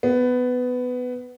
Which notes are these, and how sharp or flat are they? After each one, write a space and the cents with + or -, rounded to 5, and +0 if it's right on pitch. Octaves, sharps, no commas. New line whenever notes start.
B3 +15